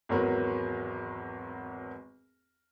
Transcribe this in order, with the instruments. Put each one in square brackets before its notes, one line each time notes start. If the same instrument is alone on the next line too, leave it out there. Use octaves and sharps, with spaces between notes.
[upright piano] G#1 E2 F#3 A#4 B4